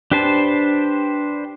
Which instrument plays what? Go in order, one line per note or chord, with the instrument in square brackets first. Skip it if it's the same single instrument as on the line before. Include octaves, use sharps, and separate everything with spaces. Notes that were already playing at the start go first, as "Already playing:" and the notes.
[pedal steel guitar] D4 G4 B4 C5 A5